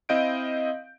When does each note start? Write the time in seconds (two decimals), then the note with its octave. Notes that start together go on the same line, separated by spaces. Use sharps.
0.09 C4 E4 D#5 F5 G6 D7